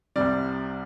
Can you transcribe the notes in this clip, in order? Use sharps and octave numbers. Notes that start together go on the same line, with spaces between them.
C2 C3 G3 D5